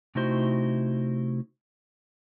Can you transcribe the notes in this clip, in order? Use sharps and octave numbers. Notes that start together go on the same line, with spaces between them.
C3 A3 D#4 E4 F#4 C5